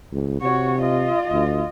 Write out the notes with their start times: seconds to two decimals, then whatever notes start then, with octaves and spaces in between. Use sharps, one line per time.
0.12 C#2
0.41 C3 F#4 C#5
0.82 F4 D#5
1.32 D2